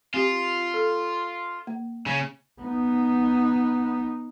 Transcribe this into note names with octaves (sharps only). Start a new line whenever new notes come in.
C4 F4 G4
A4
A#3
C#3 C#4
B3 D#4